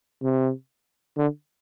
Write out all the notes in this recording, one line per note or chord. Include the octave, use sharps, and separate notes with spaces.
C3
D3